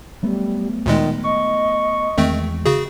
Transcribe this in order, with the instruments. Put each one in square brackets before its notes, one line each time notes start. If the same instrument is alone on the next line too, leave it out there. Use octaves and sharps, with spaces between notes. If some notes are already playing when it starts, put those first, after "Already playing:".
[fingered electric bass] F#3 A3 B3 [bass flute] G3
[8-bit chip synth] D2 A#2 G#3 [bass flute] D#3
[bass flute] D#5 [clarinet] C#6
[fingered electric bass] E2 G#3 [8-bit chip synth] D#3 A3 C4
[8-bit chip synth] C#3 F#4 G#4